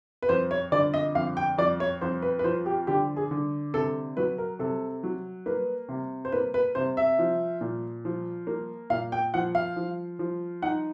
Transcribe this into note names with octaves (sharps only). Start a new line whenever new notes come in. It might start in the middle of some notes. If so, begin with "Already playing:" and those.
B4
F2 C5
C#5
D3 D5
D#5
F2 F5
G5
F2 D5
C#5
F2 C5
B4
B4
F3 C5
G4
D3 G4
G#4
D3
C3 A4
F#3 B4
A#4
C3 A4
F#3
A#3 B4
C3
C5
A#3 B4
B4
C3 C5
E5
F3
A#2
F3
A#3
A#2 F5
G5
F3 F#5
F5
F3
F3
D#4 F#5